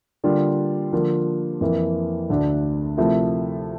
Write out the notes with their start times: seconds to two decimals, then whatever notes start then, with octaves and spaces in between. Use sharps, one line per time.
0.24 D3 G3 A#3 D4 F4
0.92 D3 F3 A#3 F4
1.61 F2 E3 A#3
2.30 D2 D3 A3 D4
2.98 C3 F3 A3 E4 A#4